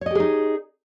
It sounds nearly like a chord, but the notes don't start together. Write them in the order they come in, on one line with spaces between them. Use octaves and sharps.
C#5 D#5 G4 G#4 D#4